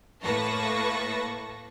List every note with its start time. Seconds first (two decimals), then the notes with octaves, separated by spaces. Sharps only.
0.24 A2 A#3 B4 A5 C#6 A#6